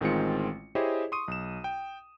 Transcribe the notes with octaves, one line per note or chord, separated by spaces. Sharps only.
A1 D#3 G#3 C4 F4 C#7
E4 G4 G#4 C5 C#5 D#5
C6 C#6 D#6 D#7
B1 E7
G5